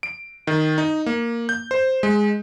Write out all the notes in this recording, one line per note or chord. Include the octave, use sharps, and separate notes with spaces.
D7
D#3
D#4
A#3
G6
C5
G#3